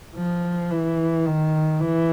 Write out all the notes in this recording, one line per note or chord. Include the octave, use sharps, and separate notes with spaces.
F3
E3
D#3
E3